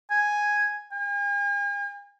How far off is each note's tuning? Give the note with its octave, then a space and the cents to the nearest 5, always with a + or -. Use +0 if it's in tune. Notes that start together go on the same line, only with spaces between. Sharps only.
G#5 +0
G#5 -45